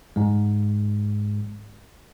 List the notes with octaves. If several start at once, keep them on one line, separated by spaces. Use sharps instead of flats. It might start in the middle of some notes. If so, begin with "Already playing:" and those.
G#2 G#3